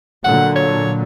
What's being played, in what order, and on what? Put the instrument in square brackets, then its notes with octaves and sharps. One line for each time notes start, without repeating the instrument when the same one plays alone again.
[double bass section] A#2 D3 F#3 [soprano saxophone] F#5
[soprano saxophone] C#5